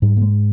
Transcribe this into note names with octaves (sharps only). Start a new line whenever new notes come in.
G#2 G3
A#3
G#3